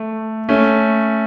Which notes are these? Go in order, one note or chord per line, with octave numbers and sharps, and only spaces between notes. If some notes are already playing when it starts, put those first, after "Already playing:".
Already playing: A3
A3 C#4